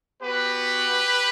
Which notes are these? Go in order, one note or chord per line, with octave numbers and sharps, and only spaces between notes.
B3 F#4 G4 B4